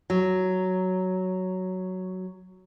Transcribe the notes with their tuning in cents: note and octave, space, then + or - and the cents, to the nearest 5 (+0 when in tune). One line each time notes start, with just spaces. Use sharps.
F#3 +5